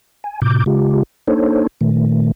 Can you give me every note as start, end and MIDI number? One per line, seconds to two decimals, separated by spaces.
0.24 0.40 80
0.42 0.64 45
0.42 0.64 48
0.42 0.64 86
0.42 0.64 91
0.66 1.03 49
0.66 1.03 56
0.66 1.03 65
0.66 1.03 67
1.28 1.67 58
1.28 1.67 62
1.28 1.67 63
1.28 1.67 69
1.28 1.67 72
1.28 1.67 73
1.81 2.32 46
1.81 2.32 51
1.81 2.32 57